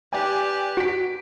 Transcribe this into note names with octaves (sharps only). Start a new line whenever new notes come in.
G4 B4 D5 G5 G#5
F#4 B6 D7